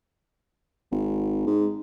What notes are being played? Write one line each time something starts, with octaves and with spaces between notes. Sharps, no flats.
G#1
G#2